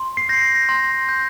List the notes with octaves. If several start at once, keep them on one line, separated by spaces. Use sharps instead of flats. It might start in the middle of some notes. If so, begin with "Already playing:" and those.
Already playing: C6
C7
G6 A#6
C6
G6